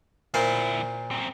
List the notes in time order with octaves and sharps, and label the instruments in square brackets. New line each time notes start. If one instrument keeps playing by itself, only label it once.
[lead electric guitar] D2 E4 [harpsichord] A#2 A#3 C5
[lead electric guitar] F#2 C4